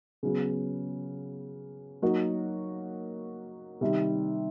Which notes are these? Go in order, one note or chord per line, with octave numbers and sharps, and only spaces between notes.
C#3 F#3 B3
F#3 A#3 D#4 F#4
C3 D#3 G3